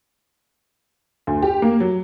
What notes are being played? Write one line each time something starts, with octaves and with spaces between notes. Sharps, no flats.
D2
G4
A#3
F#3